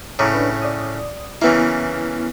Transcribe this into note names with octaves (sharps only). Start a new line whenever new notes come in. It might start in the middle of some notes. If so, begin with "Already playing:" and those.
A2 C#3 A#5 D6 D#6
D4 B4 C#5
D5 D#6
C#3 E3 A#3 B3 E4